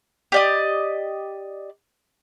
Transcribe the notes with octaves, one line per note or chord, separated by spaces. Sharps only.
G4 D5 D#5